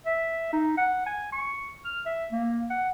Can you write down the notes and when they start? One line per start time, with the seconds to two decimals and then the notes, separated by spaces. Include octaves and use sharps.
0.06 E5
0.53 D#4
0.77 F#5
1.06 G#5
1.32 C#6
1.85 F6
2.06 E5
2.32 A#3
2.70 F#5